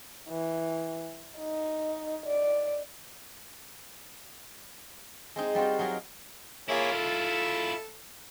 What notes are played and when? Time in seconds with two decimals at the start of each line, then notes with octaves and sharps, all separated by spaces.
0.29 E3
1.38 D#4
2.26 D5
5.36 G#3 C4 D#4
5.55 G3 C4 F4 F#4
5.79 F#3 D#4 G#4 A#4
6.69 A#3 E4 F4 G#4 C#5
6.92 A4